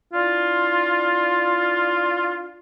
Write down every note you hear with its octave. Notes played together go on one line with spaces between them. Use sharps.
D4 E4 F4